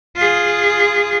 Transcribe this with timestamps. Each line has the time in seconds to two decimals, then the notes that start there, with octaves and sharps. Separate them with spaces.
0.16 F4 G#4